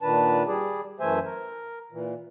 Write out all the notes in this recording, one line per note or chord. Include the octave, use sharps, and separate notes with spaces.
A#2 D#3 D4 B4 A5
G3 G#4 D5
F#2 E3 A3 C5 E5 G#5
A#4
A#2 E3